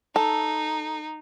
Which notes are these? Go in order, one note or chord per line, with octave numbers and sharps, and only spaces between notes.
D#4 A4